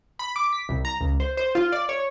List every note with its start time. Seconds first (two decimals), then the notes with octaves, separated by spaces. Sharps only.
0.19 B5
0.36 D6
0.53 B6
0.69 C2
0.85 A#5
1.01 C#2
1.20 C5
1.37 C5
1.55 F4
1.72 D5
1.89 C#5